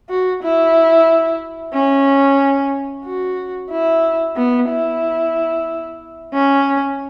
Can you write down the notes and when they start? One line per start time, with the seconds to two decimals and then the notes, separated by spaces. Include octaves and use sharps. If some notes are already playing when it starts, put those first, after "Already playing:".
0.10 F#4
0.43 E4
1.74 C#4
3.05 F#4
3.71 E4
4.37 B3
4.69 E4
6.34 C#4